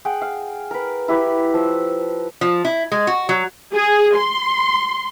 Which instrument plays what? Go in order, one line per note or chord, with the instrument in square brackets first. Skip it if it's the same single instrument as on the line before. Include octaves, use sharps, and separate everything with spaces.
[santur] G#4 F#5 G5
F5
A#4 B4
E4 G4 B4
F3 E6
[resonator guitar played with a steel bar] F3
E4
G#3
F#4
F#3
[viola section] G#4
C6